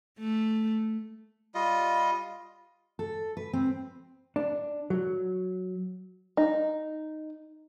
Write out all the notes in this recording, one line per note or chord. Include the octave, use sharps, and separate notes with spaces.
A3
G3 F4 D#5
A4
B4
C4
D4
F#3
D#4